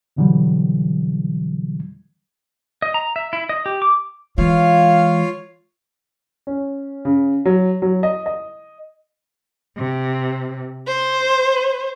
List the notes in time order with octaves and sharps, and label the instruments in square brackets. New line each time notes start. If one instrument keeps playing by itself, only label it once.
[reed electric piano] F2 B2 D3 E3 F#3 G3
[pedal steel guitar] D#5
A#5
E5
E4
D#5
G4
D6
[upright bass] E3 G#3 [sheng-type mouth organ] F4 C#5 F5
[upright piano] C#4
C#3
F#3
F#3
D#5
D#5
[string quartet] C3
C5